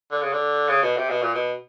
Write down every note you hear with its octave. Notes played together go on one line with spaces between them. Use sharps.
D3
C#3
D3
C#3
B2
C3
B2
A#2
B2